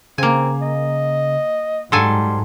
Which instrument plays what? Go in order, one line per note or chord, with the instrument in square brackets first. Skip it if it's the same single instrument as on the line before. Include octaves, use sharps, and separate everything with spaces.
[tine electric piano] C#3 [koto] A#3 G#5 [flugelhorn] C4
[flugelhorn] D#5
[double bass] G#2 [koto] F#3 A4 G#5 [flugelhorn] G3 [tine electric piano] C6